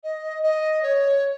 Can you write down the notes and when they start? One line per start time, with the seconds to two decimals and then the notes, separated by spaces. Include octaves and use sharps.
0.04 D#5
0.43 D#5
0.83 C#5